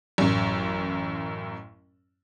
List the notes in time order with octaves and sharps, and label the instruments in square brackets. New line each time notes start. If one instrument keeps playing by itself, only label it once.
[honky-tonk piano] A1 F#2